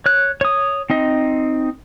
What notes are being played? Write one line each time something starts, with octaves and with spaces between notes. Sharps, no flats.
C#5 F#6
C#5 D#6
C4 D#4 D#5